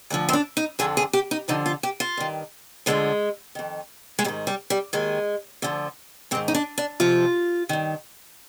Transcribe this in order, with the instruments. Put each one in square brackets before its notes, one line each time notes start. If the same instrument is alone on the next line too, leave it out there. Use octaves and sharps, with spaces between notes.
[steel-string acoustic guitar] D2 D3 F3
C4
D4
D#4
F2 D3 F3 G#4
G#4
G4
D#4
F2 D3 F3 D#4
F4
G4
F4
G2 D#3
D2 D3 F3 G#3
F2 D#3
G#3
G#2 G3
D#3
G3
G3
D#2 D#3 G#3
D2 D3 F3
G#2 C4
D#3
D#4
D4
D4
F2 C3 F3 F4
G2 D#3